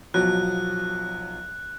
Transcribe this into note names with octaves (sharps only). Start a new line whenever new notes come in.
B1 F3 F#3 F#6